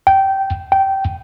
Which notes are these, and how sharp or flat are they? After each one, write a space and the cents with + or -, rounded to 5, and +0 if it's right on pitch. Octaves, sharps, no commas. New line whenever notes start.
G5 -15
G5 -15